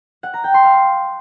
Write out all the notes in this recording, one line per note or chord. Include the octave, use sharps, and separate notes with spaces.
F#5
A#5
G5
C6
F5